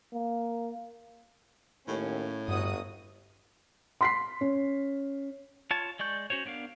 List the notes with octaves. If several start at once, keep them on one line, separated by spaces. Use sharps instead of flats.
A#3
D#2 A2 C#4
G1 G2 F#4 D#6
C6 B6 C7
C#4
F4 C#5 A5
G#3 D5 C#6 G6
C#4 F#4 C5 C#5
B3 D4 A#4 F5